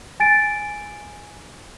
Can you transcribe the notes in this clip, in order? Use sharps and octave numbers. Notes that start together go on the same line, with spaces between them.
G#5 A6 D7